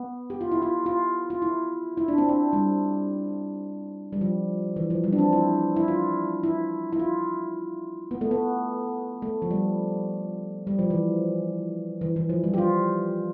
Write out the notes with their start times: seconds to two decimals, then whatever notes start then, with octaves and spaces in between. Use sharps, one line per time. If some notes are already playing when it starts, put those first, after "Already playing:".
Already playing: B3
0.30 G4
0.41 F4
0.52 E4
0.62 F4
0.86 F4
1.30 F4
1.42 E4
1.97 E4
2.08 D4
2.18 C4
2.29 D4
2.53 G3
4.13 G3
4.21 F3
4.76 E3
4.90 F3
5.04 G3
5.12 D4
5.18 C4
5.33 E4
5.76 E4
5.88 F4
6.43 E4
6.93 E4
6.99 F4
8.11 B3
8.21 A3
8.31 B3
9.22 A3
9.42 F3
9.51 G3
10.67 G3
10.79 F3
10.90 E3
12.01 E3
12.16 E3
12.29 F3
12.44 G3
12.54 G4
12.58 F4